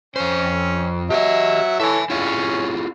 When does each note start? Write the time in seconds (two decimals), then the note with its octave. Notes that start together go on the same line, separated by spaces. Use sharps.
0.16 F2 C#4 C5
1.10 F#3 G4 D#5 E5 F#5
1.80 E3 A4 C#5 E5 G#5
2.10 C#4 E4 F4 G#4 C#5